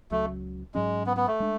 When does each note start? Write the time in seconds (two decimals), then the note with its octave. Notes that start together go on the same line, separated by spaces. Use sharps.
0.11 C#2 C#3 F#3 A3
0.75 G#2 F#3 G#3 C#4
1.07 B3
1.17 B3
1.28 A3
1.40 G#3 D4